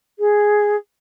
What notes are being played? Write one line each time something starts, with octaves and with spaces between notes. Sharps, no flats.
G#4